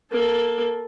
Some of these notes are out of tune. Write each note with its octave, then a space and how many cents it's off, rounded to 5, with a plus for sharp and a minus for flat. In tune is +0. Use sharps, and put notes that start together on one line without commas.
A#3 +15 A4 +0